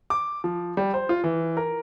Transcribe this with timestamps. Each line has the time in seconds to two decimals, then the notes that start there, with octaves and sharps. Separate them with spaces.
0.10 D6
0.44 F3
0.77 G3
0.94 C5
1.09 F4
1.24 E3
1.57 A#4